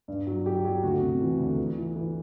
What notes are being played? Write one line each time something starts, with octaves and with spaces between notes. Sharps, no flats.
G2
F#3
F#3 G4
F#3 G4
D2 F#4
C3
E3
D2
E3
E3
E3